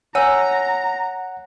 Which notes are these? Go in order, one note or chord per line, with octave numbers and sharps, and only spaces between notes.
C#5 F#5 G#5 A#5 E6